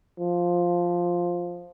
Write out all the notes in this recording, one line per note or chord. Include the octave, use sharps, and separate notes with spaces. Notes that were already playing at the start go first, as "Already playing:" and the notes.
F3